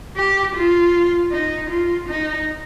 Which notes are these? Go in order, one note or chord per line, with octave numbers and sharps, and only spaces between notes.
G4
F4
D#4
F4
D#4